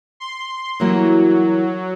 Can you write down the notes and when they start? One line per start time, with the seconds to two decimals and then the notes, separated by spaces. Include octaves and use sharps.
0.20 C6
0.80 E3 F#3 G3 A#3